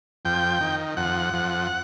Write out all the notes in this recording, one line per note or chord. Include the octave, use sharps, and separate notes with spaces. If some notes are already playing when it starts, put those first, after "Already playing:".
F2 G5
D#3
F2 F#5
F2